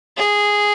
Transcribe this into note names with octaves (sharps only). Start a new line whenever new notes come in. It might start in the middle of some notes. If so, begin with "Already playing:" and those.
G#4